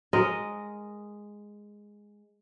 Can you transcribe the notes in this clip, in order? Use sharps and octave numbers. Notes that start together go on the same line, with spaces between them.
G#3 A#4 D#5